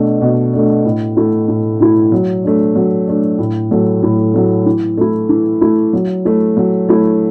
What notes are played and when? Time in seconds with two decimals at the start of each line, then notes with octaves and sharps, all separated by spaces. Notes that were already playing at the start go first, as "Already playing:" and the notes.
Already playing: B2 A3 D4
0.22 B2
0.53 A3 D4
0.85 A2
1.17 E3 A3 E4
1.48 A2
1.80 E3 A3 E4
2.12 F#3
2.44 A3 D4
2.76 F#3
3.07 A3 D4
3.39 A2
3.71 F#3 A3
4.03 A2
4.34 F#3 A3
4.66 E3
4.97 A3 E4
5.29 E3
5.61 A3 E4
5.93 F#3
6.25 A3 E4
6.57 F#3
6.89 A3 E4